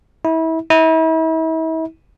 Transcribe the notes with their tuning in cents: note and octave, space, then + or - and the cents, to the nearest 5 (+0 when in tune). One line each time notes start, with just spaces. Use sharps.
E4 -30
E4 -40